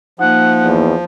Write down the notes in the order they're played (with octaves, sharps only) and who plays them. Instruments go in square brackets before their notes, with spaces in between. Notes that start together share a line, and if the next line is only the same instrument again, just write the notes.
[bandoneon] F3 [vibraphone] A#3 D#4 [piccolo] F#5
[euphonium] E2